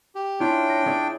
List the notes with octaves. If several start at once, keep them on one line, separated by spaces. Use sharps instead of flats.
G4
C#4 D4 E4 F4 G5
A#6 C#7
C#4 G#4 D5